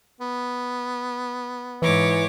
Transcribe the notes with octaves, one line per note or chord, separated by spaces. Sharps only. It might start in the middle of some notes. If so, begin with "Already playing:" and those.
B3
G#2 E3 C#5 D6